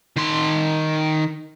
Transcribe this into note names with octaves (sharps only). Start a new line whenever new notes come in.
D#3 C6